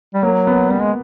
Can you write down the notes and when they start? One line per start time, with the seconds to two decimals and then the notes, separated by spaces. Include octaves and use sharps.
0.14 G3
0.23 F#3 A#3
0.47 B3
0.71 G3 B3
0.81 G#3